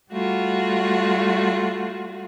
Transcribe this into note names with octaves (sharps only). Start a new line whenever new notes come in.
G3 A3 F4 F#4